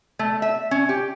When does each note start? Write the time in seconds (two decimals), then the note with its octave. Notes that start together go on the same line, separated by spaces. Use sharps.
0.19 A3
0.42 E5
0.71 C#4
0.89 G4